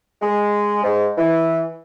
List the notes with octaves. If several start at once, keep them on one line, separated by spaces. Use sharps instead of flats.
G#3
G#2
E3